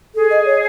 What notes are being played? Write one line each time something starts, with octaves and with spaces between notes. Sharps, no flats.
G#4 A4
D#5
C#5